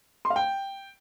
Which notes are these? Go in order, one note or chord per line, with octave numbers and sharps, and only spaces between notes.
C6
F5
G5